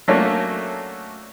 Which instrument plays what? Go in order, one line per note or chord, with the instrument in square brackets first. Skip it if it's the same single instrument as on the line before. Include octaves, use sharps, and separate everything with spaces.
[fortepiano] F#3 A3 A#3 C#4 D4